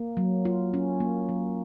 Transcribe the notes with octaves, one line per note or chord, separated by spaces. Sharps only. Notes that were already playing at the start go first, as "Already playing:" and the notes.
Already playing: A#3
F#3
F4
C#4
A#3
F#3